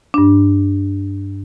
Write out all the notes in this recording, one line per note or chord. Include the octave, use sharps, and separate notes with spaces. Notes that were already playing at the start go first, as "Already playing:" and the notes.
G2 D4